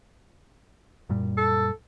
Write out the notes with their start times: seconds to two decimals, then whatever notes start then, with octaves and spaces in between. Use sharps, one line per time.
1.09 F#2 A#2 G3
1.37 A4